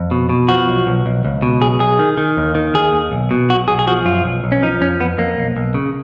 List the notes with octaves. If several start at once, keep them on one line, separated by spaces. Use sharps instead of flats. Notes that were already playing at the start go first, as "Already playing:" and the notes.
Already playing: F2
B2
B2
F3 F#4
B1
B1
B1
C#2
B2
B1 G#4
B1 G#4
D#3
D#3
D#2
D#3
D#2 G#4
D#2
B1
B2
B1 F#4
B1 G#4
G#4
F3 F#4
F#2 F4
B1
B1
C#4
F3 D#4
F2 C#4
F2 B3
F2 A#3
B1
B1
C#3